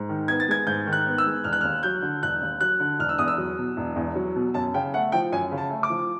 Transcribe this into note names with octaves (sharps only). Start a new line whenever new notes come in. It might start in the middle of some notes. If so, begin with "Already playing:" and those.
Already playing: G#2
D#3
B3 G#6
A6
G#3 G#6
G#2 G6
D#3
F#6
B3
E6
G#3
E1 F6
F#6
F6
D#2
F#3 G6
D3
E1 F#6
D#2
F#3 F#6
D3
E1 F6
E6
E2 D#6
E6
F#3
B2
E1
E2
F#3
B2
F#2 A5
C#3 G5
A3 F#5
F3 G5
F#2 G#5
C#3
A5
A3
D6
F3